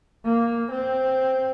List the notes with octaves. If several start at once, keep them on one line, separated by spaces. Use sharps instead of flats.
A#3
C4